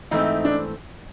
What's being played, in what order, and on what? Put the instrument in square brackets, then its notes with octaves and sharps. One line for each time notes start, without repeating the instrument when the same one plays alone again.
[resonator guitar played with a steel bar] G#2 E3 A3 C4 [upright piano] D#4
[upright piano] D4